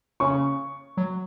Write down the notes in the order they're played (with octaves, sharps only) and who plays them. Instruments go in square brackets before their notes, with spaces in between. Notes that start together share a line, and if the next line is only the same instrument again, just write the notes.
[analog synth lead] C#3 [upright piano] C#6
[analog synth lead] F#3